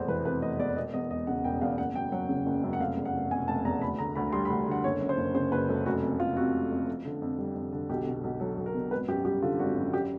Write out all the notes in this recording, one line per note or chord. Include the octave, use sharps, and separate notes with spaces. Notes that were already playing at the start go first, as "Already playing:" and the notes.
Already playing: F1 E2 B2 C5
E3 B4
C3 B4
F1 D#5
E2 D5
E1 D#5
E2 D#5
E1 D#5
C#3 F#5
E1 G5
E2 F5
F#1 F#5
F#2 G5
F#3 F#5
C#3
F#1
F#2
F#5
F1 F5
E2
F#5
F1
B2 G#5
F1 A5
E2 A#5
D2 B5
D3 A#5
D2 B5
G3 C6
B5
D2
D3 F#5
F#1 C#5
F#2
C5
F#1
C#3 C5
F#1 B4
F#2 A4
F1 F#4
F2
F1 F4
C3 F#4
F1
F2
F2
D3
F2
G3
F2
D3
B1 G4
B2
B1
F#3 A4
B1
A#4
B2
G#1 B4
F#2 G4
G3 G4
D3 F4
G#1 F#4
F#2
G4